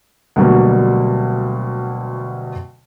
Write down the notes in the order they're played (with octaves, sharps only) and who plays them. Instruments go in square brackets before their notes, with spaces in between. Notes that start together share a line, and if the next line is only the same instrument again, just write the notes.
[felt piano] D2 B2 D3 F#3 G3 A#3